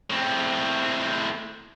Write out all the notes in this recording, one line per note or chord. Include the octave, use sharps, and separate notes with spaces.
A2 C4